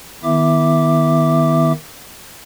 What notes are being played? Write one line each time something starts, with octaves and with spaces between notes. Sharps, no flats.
D#3 B3 E4 E5 D6